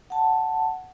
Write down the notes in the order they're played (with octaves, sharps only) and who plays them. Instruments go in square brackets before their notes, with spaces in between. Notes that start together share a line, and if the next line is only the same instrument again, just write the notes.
[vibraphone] F#5 A5